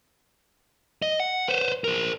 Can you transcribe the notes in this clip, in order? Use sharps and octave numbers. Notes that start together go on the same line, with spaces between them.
D#5
F#5
B4 C5
A#4 C5